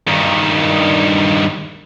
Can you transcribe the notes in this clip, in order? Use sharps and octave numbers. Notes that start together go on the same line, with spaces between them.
G2 D#3